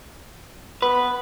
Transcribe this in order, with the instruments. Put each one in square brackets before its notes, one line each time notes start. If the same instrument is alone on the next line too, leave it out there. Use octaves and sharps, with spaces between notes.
[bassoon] B3 [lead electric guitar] B4